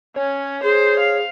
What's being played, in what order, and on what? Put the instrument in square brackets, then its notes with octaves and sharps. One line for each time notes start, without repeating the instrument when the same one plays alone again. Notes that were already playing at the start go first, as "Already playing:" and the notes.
[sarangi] C#4 [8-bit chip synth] C#5
[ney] G#4 [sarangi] C5
[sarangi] F5